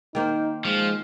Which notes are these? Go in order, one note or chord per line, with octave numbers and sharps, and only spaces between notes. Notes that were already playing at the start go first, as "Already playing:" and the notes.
D#3 A#3 D#4 C5
F3 G#3